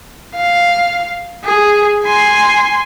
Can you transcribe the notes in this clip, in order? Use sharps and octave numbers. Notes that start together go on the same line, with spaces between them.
F5
G#4
G#5 C6